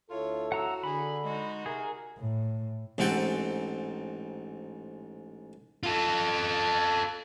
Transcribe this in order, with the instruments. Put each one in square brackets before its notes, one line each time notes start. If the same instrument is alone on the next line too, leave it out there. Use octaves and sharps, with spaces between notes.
[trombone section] D2 E4 A4 [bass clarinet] F4 [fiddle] C#5
[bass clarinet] F#4 [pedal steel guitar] F#5 A#5 E6
[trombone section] D3 [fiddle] G#4 [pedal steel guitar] B5
[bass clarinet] G#3 [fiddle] D#4 F#4
[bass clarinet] C3 [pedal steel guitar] G#4 [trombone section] A#4
[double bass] A2
[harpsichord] A1 G#2 C4 A4 F#5 G5
[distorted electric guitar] F4 A4